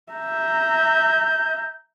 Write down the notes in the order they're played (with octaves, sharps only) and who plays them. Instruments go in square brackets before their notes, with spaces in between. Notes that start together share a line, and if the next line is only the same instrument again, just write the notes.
[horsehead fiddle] E5 A#5 [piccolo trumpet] G6